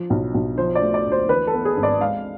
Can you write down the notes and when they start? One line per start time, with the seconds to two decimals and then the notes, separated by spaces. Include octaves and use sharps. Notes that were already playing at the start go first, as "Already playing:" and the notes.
Already playing: F3
0.10 B1
0.34 B1
0.58 F3 C5
0.75 D5
0.82 A3
0.94 D5
1.06 D2
1.12 C5
1.29 E3 B4
1.47 A4
1.53 B3
1.65 G#4
1.77 G#1
1.83 D5
2.01 G#3 F5